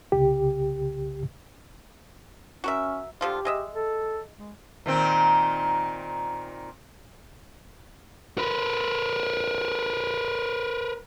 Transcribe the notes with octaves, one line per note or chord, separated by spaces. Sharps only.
C2 C#3 G4
C#4 F#4 A#4 E5
D3 F3 F4 G4
G#3 D#5 E5
A4
G#3
A#2 D#3 C4
A#4 B4